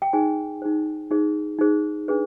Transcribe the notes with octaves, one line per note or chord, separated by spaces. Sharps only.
G5
D#4 G#4 C5 G#5
D#4 G#4 C5
D#4 G#4 C5
D#4 G#4 C5
D4 G#4 B4